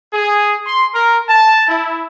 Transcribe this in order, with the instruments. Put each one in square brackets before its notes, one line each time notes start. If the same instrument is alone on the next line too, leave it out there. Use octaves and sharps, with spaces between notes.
[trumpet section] G#4
C6
A#4
A5
E4